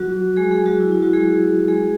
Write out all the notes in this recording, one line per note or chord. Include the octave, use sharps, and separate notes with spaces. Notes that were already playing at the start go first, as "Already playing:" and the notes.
Already playing: F#3 F#4
G#3 G#4
G#3 G#4
F#3 F#4
E4
E4
F#3 F#4
G#3 G#4
G#3 G#4